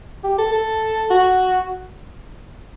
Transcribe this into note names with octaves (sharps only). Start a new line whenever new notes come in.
G4
A4
A4
F#4